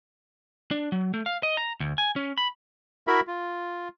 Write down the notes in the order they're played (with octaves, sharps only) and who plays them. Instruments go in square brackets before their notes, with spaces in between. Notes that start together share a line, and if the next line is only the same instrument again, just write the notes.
[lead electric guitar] D4
F#3
A3
F5
D#5
A#5
D2
G#5
C#4
B5
[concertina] E4 F#4 A#4 E5 B5
F4